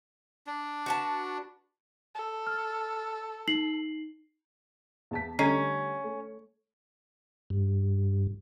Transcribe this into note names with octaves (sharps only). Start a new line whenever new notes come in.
D4
F#4 B4 A5
A4
F6
D#4 C7 F#7
E2 A5 B6
D3 G3 A3 C#4 D#5 A#5 C7
A3
G2